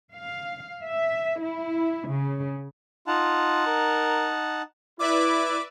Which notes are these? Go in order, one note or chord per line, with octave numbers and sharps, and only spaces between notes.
F5
E5
E4
C#3
D#4 F4 F#5 A5
A#4
E4 B4 D5 E5 D6